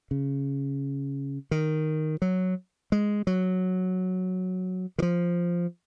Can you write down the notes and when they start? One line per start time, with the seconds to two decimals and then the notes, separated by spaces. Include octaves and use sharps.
0.11 C#3
1.51 D#3
2.22 F#3
2.92 G#3
3.27 F#3
4.98 D#3
5.02 F3